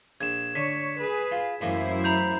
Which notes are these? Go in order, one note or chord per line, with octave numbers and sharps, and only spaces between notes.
A#1 G#6 E7
D3 C#5 B6
G#4 B4
F4
F#2 A2 E3 A#3 E4 C5
A#5 B5 G6